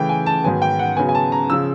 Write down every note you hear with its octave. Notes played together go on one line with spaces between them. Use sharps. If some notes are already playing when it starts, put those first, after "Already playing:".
Already playing: C#3 E3 A3 G5
G#5
A5
G#2 D#3 F#3 B3 G#5
G5
F#5
C#3 F#3 B3 G#5
G#5
A5
A#5
C#3 F3 E6